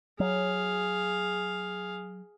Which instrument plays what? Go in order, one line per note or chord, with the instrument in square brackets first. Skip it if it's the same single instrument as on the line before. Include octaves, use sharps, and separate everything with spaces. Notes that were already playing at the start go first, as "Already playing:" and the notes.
[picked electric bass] F#3 [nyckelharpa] G#4 F5